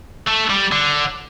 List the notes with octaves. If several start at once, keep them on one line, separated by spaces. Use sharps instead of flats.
A3
G3
D3